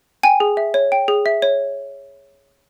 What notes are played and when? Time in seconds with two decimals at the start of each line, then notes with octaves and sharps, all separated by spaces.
0.23 G5 G#5
0.40 G#4
0.57 E5
0.74 C#5
0.92 G5
1.08 G#4
1.26 E5
1.42 C#5